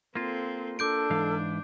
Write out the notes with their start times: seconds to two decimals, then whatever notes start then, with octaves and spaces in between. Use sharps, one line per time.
0.15 A#3 C4 F4 A4
0.79 D4 A4 D6 G6 D7
1.10 G#2 E3 F5